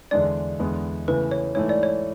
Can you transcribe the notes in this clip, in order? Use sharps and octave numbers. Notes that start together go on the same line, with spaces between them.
E2 D3 G#3 D4 D5
E2 D3 G#3 B3
C#3 E3 A3 B4
C#5
G#2 E3 A3 C#5
D5
C#5